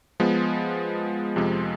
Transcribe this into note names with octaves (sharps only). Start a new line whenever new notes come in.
F3 G#3 B3
F2 C3 F3 G#3